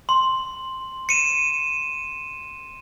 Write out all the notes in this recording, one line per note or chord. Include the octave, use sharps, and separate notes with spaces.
C6
C#7 D#7 E7